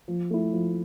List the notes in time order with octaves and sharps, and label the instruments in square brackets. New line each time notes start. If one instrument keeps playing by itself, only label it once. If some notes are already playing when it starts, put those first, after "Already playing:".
[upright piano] F3
A3 E4
F3